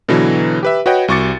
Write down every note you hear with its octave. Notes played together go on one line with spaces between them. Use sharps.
B2 D3 E3 F#3
G4 B4 E5
F#4 B4 C#5 D#5 F#5 G5
C2 F#4 C#6 D6 A6 C#7